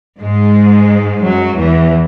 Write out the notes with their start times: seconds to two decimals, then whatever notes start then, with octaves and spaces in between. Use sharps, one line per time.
0.20 G#2 G#3
1.23 F#2 F#3
1.57 E2 E3